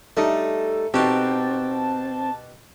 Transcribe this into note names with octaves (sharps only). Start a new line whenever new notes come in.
G3 A3 D#4 A4
B2 C4 D#4 F#4 G4 A5